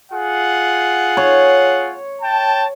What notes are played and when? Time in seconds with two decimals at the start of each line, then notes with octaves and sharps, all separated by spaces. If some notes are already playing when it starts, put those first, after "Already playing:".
0.12 F4 G#4 F#5
1.17 C#5
2.22 G5 A5